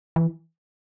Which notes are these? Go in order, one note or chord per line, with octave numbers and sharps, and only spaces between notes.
E3